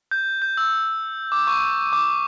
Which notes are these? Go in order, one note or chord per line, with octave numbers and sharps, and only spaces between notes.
G6
G6
E6
D6
C#6
D6